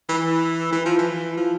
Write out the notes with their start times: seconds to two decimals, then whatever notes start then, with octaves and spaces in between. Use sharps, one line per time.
0.09 E3
0.72 E3
0.85 F3
0.99 E3
1.37 F3